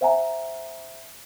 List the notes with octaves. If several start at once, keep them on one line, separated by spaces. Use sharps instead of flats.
C5 E5 F#5 G#5 A#5